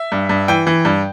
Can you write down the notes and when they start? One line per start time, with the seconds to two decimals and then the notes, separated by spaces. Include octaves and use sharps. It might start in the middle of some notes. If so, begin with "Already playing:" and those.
Already playing: E5
0.12 G2
0.29 G2
0.48 E3 G5
0.67 E3
0.85 G2